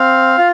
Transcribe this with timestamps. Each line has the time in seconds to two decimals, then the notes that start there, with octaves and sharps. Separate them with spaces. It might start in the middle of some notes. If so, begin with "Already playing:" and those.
Already playing: C4 F5
0.38 F4